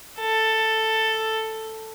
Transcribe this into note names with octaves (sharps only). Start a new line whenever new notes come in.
A4